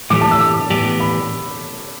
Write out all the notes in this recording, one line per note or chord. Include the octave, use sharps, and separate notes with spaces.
A2 E3 A3 G4 D6
A5
E6
D6
A2 E3 B3 G4 D5
B5